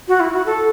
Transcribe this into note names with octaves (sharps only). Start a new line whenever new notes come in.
F#4
E4
F#4
A4